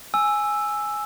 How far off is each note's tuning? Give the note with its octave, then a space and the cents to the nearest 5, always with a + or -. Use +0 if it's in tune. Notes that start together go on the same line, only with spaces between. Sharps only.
G#5 +0 E6 +0